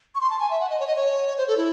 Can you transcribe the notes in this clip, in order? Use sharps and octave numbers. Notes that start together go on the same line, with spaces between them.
C#6
C6
A5
G#5
E5
F#5
D#5
C#5
D#5
C#5
C5
A4
E4